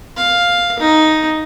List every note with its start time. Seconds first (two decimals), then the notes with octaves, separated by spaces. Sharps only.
0.16 F5
0.79 D#4